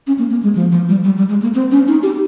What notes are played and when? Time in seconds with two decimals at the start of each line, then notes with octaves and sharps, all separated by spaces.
0.07 C#4
0.19 A#3
0.31 A#3
0.43 G#3
0.55 F3
0.72 F3
0.89 G3
1.04 G3
1.17 G3
1.29 G#3
1.42 A#3
1.55 C4
1.71 C#4
1.88 D#4
2.03 G4